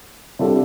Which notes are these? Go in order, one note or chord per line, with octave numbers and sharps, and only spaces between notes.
C3 G3 D4 F4 A4